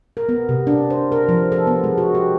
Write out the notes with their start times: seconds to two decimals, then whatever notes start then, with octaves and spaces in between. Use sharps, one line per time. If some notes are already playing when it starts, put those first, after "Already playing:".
0.17 A#4
0.29 B3
0.49 C3
0.67 D4
0.90 C5
1.12 A#4
1.29 F3
1.52 A4
1.67 B3
1.84 G#3
1.98 F#4
2.15 G4